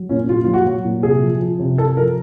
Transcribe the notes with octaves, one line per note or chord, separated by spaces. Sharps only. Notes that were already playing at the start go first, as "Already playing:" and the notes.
Already playing: F#3
A#2 C#4
A#2 F4
F#3 F4
F#4
F#3
A#2
C3 G#4
F3
F3
C3
C3 A4
F3 A#4